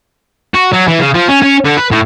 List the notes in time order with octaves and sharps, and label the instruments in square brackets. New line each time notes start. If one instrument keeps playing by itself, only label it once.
[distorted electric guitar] F#4
F#3
E3
C#3
F3
C#4
C#4
D3
B4
A2